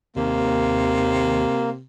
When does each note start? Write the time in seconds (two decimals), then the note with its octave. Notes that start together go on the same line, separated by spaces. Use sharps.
0.16 D#2 C3 A#3